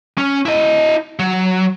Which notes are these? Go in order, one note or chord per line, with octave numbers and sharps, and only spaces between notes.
C#4
E4 D#5
F#3